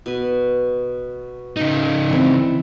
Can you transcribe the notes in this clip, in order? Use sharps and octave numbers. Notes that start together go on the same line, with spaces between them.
B2 B4
C#3 D#4
E3 C4